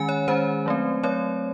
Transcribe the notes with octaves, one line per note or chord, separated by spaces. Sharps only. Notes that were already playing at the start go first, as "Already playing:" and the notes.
Already playing: D#3 G#3 C#4 G#5
C#5
D#3 G#3 C#4 C5
F#3 A3 C4
F#3 A3 C4 C#5